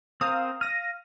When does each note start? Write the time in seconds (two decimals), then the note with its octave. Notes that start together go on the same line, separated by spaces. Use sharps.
0.21 C4 A#4 C5 F5 D#6
0.61 F5 F6 A#6 D#7